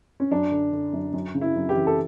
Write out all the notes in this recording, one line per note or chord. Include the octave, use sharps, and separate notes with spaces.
C#4
F#2 D4
D3
D3
F#2
F#2
C#3
E4
F#2
G4
E3
A4